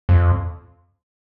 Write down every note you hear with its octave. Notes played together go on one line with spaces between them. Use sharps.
F2